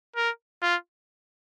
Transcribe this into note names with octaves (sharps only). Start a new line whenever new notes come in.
A#4
F4